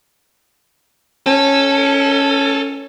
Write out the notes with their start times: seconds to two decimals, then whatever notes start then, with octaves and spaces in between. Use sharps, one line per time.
1.26 C#4 A4